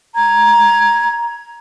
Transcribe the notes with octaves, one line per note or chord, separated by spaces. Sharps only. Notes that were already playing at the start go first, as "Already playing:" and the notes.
A#5 G#6